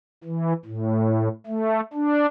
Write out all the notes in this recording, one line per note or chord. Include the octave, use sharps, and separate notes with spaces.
E3
A2
A3
D4